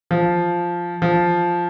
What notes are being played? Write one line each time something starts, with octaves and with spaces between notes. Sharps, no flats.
F3
F3